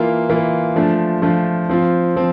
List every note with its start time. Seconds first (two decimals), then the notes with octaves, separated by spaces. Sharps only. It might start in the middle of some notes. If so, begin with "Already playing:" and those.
Already playing: E3 A#3 F4
0.29 E3 A#3 F4
0.76 F3 A3 D4 F4
1.22 F3 A3 D4 F4
1.69 F3 C4 F4
2.16 F3 C4